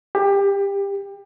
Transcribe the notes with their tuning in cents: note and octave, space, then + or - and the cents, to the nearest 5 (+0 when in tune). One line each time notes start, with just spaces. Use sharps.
G4 +25